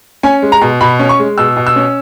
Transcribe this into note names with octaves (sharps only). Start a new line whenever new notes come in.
C#4 G#5
G#3
A#5
B2
B2 B5
C#4
C#6
G#3
B2 E6
B2
E6
C#4